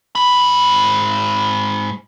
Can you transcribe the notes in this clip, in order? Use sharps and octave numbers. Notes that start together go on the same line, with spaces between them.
G#2 B5